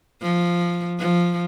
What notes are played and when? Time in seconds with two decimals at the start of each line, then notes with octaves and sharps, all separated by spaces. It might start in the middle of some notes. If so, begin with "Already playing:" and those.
0.22 F3
0.99 F3